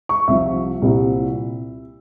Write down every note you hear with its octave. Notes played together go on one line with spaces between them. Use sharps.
C#6
C2 C3 F3 E5
C2 A#2 G3 C4 E4